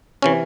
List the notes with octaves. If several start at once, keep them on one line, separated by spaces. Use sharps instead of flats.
C3 E3 C#4